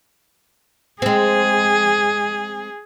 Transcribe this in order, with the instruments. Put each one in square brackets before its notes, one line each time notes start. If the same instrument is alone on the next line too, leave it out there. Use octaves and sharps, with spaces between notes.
[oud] G#3 C4 [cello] G#4